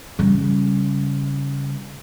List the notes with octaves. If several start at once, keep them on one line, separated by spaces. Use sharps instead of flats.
C#3 G3